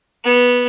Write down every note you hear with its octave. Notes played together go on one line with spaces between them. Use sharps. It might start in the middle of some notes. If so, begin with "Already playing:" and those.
B3